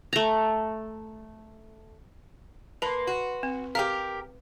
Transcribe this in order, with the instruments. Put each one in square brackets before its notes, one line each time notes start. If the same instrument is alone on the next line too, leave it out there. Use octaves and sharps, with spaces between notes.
[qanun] A3 A#5
[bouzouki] A#3 [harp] B4 C6 [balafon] A5 B5
[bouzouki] F#4
[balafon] C4
[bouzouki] G4 G#4 A#4 [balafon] F5